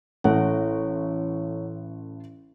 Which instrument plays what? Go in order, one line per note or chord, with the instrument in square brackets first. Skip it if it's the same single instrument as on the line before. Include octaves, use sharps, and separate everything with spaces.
[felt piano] A1 A3 F#5 [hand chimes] E4 A4 C#5